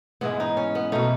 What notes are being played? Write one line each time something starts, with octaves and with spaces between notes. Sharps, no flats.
G#2 E3 G#3 B3
D#4
C#4
B3
B2 A3 D#4